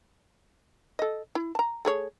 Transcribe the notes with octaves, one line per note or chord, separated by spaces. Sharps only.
A4 D#5
E4
A5 A#5
A3 G#4 C#5